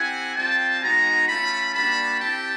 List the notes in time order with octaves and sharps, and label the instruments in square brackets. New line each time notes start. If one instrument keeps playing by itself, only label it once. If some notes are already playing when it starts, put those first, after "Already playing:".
Already playing: [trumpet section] C4 E4 G4 F#5 G#5
G3 C4 F4 G5 A5
G#3 B3 D#4 F#4 G#5 A#5
A3 C#4 F4 A5 B5
G3 A#3 D4 F#4 A5 B5
C4 E4 G4 G5 A5